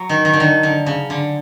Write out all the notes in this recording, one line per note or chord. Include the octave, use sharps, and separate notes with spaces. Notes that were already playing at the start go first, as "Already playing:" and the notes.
Already playing: F#3
D#3
D#3
D3
D#3
D3
C#3
D3